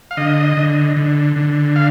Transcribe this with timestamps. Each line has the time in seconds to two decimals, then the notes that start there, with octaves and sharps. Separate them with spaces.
0.11 F5
0.17 D3 D#5
0.57 D3
0.97 D3
1.36 D3
1.76 F5